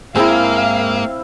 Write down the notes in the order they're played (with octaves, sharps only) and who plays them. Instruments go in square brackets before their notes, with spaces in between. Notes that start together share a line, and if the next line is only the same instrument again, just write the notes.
[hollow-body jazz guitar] G#2 G#4 A#4 [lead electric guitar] A#3 [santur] C4 E4 [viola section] F5